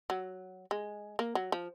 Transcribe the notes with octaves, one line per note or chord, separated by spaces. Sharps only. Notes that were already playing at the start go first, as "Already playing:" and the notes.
F#3
G#3
A#3
F#3
F3